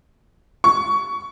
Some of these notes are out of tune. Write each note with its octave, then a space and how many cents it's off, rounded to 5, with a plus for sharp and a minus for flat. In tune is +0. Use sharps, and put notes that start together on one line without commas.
C#6 +15